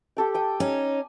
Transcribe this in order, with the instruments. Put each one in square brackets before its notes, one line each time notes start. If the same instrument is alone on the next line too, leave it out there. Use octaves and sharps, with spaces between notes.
[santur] G4 A4 G5
G5 D#6
[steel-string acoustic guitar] C#4 D#4 [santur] G#5